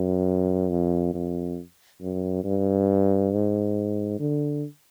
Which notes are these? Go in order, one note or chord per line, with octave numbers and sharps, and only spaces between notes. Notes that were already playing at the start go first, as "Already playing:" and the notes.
Already playing: F#2
F2
F2
F#2
G2
G#2
D3